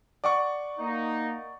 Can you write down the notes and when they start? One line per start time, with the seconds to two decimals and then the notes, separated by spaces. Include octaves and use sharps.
0.24 D5 F#5 C#6
0.79 A#3 D#4